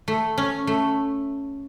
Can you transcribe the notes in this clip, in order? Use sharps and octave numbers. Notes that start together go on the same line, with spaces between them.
A3
C#4
A3